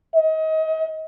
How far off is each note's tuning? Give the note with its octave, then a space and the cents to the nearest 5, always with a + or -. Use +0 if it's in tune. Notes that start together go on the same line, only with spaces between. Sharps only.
D#5 +30